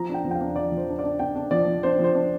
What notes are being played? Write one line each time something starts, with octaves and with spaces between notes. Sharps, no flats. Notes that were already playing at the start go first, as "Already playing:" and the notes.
Already playing: F3 A#5
D4 G5
F3
G5
F5
D4
F3 D5
F3
C5
D4
D4 D5
D4 G5
D4
F3 D5
F3
D4 C5
F3 C5
D4